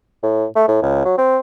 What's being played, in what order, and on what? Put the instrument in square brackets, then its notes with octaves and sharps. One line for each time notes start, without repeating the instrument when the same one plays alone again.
[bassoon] A2
A3
A2
C#2
F#3
C4